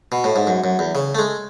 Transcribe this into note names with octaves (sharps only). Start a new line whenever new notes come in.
B2
A2
G#2
F#2
F#2
E2
C#3
A3
G#3